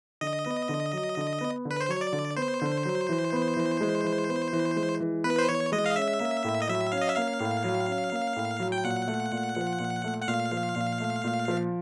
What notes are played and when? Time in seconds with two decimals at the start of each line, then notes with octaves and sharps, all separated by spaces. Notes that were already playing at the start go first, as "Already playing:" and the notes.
0.21 D3 D#5
0.46 B3
0.69 D3
0.93 F#3
1.17 D3
1.41 B3
1.65 D3
1.71 B4
1.81 C5
1.89 F#3 C#5
2.01 D5
2.12 D3
2.36 B3 C5
2.61 D3
2.85 F#3
3.09 E3
3.32 B3
3.57 E3
3.81 G#3
4.04 E3
4.29 B3
4.53 E3
4.76 G#3
5.00 E3
5.24 B3 B4
5.38 C5
5.49 E3 C#5
5.72 G#3 D#5
5.86 F5
5.96 C#4 E5
6.20 A#3
6.44 A2
6.62 D#5
6.69 F#3 E5
6.92 C#4 F5
7.01 D#5
7.09 E5
7.16 A#3 F5
7.40 A2
7.64 F#3
7.88 C#4
8.12 A#3
8.36 A2
8.60 F#3
8.72 G5
8.84 A#2 F#5
9.08 A3
9.32 A#2
9.56 F3
9.79 A#2
10.04 A3
10.22 F#5
10.28 A#2 F5
10.52 F3
10.76 A#2
11.00 A3
11.24 A#2
11.48 F3